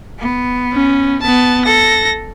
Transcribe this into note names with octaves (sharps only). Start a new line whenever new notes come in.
B3
C#4
B3 A5
A4 A#6